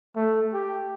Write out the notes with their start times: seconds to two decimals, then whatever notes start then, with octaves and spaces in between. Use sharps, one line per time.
0.16 A3
0.53 G4